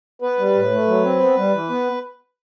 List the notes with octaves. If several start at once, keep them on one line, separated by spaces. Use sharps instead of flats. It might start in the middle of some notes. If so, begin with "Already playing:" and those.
B3 B4
G3
A2
A3
F#3
C4
B3
G3
E3
B3